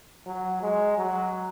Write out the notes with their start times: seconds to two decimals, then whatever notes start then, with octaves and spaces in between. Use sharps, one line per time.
0.27 F#3
0.62 G#3
0.97 F#3